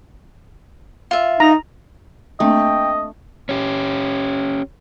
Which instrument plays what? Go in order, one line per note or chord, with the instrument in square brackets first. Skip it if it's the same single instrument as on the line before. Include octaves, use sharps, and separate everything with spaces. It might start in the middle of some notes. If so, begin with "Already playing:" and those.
[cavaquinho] F4 E5
[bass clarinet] D#4 [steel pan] A#5
[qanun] A3 [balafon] A#3 C4 D4 [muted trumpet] D#5 [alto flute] G5
[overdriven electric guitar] C#4 G4